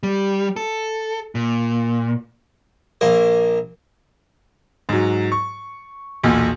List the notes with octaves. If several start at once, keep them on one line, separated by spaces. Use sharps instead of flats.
G3
A4
A#2
A#1 A#3
G#2 F#3
C#6
B1 E2 A#2